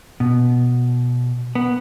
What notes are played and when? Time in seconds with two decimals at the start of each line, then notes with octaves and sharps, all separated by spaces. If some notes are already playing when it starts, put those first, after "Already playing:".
0.20 B2
1.55 B3